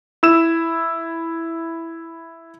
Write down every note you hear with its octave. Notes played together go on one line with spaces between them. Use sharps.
E4 E6 E7